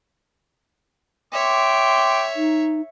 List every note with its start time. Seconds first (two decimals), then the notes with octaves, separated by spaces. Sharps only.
1.33 C#5 E5 G5 C6 D6
2.36 D#4